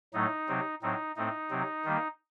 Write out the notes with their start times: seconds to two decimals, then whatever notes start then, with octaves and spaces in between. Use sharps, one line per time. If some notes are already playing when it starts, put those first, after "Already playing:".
0.14 A2 F#3 A3 D#4
0.48 C3 F#3 C4
0.82 A2 F#3 C4 D#4
1.16 A2 A3 C4 D#4
1.50 C3 F#3 C4
1.85 D#3 G3 A#3